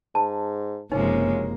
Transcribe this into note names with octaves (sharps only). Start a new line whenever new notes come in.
G#2 A5
F#1 C3 F3 G#3 A#3 C#4 D#4